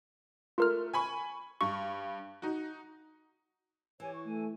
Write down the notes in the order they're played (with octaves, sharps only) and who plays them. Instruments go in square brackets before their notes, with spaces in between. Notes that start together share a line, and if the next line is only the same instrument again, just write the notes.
[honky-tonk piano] A3 [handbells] F4 A#4 F6
[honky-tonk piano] G#5 B5 C#6
[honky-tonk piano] G2 [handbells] C#6
[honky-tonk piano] D#4 F#4
[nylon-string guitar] E3 [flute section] G4 C#5 G#5
[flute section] C#6
[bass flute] A3 [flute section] G#5